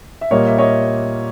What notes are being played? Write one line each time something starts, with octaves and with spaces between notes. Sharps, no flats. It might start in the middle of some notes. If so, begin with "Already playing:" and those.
E5
A#2 G3 A#3 C#5 D#5
E5
C#5 D#5